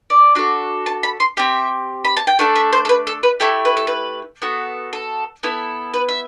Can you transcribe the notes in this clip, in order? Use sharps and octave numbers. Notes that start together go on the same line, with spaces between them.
D5
D4 F#4 A4
A5
B5
C6
C4 G4 E5
B5
A5
G5
A3 D4 A4 F#5
E5
C5
A4
B4
A4
B4
A3 E4 G4 A4
B4
A4
B4
B3 F#4 A4
A4
B3 E4 A4
B4
E5